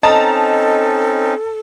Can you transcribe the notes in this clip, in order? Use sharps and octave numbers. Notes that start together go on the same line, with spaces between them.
C4 C#4 D#4 A4 D#5 A5 A#5